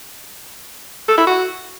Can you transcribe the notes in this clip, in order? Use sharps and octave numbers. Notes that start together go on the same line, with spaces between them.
A4
E4
F#4